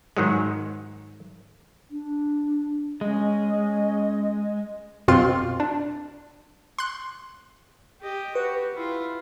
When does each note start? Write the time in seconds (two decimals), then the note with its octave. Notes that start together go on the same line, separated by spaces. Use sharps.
0.17 G#2 D#3 F#3 G#3
1.90 D4
3.01 G#3 C#4 D#5
5.08 F#2 B2 C4 F4 C6 F6
5.60 D4
6.79 C6 F#6
8.01 G4 D#5
8.35 F#4 G4 B4
8.74 E4 F4